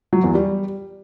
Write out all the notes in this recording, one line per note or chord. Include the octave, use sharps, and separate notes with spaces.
F#3
E2
G3